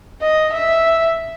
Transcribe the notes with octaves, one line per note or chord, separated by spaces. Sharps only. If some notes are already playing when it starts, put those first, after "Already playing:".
D#5
E5